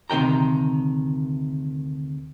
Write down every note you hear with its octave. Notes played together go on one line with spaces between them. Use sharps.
D2 C3 D#3 G5 A#5